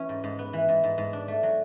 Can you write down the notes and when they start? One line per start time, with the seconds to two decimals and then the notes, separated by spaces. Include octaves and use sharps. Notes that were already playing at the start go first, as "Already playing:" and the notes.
Already playing: E3 C#4
0.09 G#2
0.24 G#2
0.39 B3
0.53 E3
0.69 G#2
0.84 G#2
0.98 G#2
1.13 D4
1.28 A3
1.43 F#3